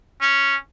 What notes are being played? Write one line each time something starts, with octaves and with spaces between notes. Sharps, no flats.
C#4